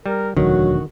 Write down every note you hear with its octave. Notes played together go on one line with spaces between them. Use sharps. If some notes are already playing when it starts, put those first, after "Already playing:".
G3 A#4
E1 D2 D3 D#3 F#3 F#4